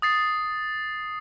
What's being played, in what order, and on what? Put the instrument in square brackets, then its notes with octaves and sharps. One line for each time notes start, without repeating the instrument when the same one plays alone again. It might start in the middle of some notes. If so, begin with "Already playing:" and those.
[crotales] D#6 A6 C7